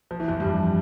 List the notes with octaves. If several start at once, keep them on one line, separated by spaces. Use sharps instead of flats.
F3
E3
F2 F3
G2 G3